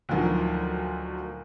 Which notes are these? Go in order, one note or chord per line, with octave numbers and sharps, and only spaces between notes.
D2 A#2 D#3 F3 F#3